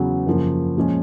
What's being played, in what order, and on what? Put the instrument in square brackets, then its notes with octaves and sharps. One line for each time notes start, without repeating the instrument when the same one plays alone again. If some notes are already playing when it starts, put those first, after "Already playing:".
Already playing: [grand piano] E2 C#3 F#3 B3
F#2 C#3 F3 A#3
A#2 F3 G#3 C#4